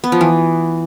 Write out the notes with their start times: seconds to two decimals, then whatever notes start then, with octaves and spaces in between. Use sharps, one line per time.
0.04 B3
0.12 F3
0.21 E3